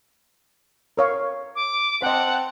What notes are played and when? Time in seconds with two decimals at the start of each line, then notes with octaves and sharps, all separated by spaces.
0.97 A#4 C#5 F5
1.56 D6
2.02 C4 C5 D#5 F#5 A5